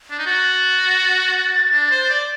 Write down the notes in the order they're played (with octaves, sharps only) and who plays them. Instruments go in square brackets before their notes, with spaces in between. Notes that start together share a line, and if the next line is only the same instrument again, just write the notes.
[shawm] D4
D#4
[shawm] F#4 [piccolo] A6
[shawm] D4
C5
D5